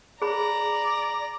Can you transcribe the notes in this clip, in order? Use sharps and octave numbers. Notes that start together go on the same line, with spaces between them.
G#4 D5 A#5 B5